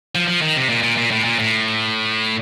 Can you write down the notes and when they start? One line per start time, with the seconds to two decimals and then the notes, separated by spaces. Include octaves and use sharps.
0.15 F3
0.28 F3
0.42 D#3
0.56 C3
0.69 A#2
0.83 A#2
0.98 A#2
1.11 A2
1.24 A#2
1.39 A2